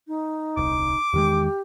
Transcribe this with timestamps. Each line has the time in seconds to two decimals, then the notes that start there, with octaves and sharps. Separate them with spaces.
0.08 D#4
0.57 D#1 C2 D6
1.13 E2 D#3 G#3 G4